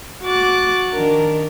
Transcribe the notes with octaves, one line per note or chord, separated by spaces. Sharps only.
F#4 D6 F#6 A6
D#3 D4 A#4